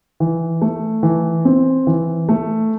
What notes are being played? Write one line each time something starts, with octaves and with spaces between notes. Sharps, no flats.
E3
A3
E3
C4
E3
A3